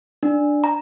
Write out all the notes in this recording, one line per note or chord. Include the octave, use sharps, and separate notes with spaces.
D4
A#5